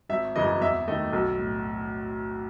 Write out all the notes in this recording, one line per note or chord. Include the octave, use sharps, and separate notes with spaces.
G#1 E5
F#2 C#3 E3 G#3 D#5
E2 E5
D#3 A3 D#5
B1 A4
A2